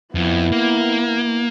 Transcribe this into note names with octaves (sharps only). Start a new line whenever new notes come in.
F2 B3 E4
A#3